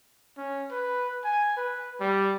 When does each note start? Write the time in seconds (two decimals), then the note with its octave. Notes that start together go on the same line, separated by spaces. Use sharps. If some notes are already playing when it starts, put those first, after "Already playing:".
0.37 C#4
0.71 B4
1.24 G#5
1.57 B4
2.00 G3